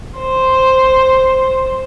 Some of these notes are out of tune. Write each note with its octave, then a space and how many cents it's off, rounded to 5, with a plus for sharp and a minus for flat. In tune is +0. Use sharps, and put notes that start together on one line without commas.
C5 +0